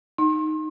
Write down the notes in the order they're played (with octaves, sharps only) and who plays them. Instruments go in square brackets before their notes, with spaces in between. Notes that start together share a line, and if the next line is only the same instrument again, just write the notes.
[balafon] D#4